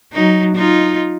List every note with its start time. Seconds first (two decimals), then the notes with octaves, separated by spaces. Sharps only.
0.12 F#3 D#4
0.55 D#4 F4